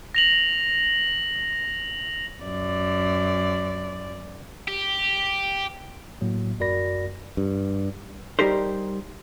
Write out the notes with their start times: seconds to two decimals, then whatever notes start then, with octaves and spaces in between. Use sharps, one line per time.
0.15 A#6 F7 F#7
2.43 F#2 D5
4.68 G4
6.21 A2 F#3 A#3
6.60 F#2 F#4 A#4 D5 B5 A#6
7.37 G2
8.39 G3 D#4 G4 A#4 C5